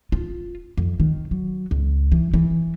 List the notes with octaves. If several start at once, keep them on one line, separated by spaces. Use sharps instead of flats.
F4
F2
D#3
F#3
C#2
E3
E3